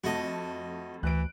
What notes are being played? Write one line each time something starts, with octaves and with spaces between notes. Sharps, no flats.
F2 A3 F#4 D#5 A5
D2 E3 F#6 D7